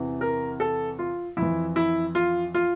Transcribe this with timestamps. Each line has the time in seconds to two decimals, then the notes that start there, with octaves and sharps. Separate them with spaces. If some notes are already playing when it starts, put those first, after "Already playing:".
Already playing: E2 C3 E3
0.21 A#4
0.60 A4
0.99 F4
1.37 F2 E3 E4
1.76 E4
2.15 F4
2.54 F4